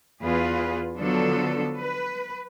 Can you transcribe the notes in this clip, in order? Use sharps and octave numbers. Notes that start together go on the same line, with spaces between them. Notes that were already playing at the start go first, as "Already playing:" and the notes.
E2 F4 G#4 B4
D3 F3 F#3 B3 D4 A4
B4